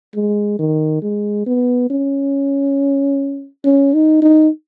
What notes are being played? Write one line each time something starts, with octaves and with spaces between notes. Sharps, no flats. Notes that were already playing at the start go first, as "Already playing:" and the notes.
G#3
D#3
G#3
B3
C#4
C#4
D#4
D#4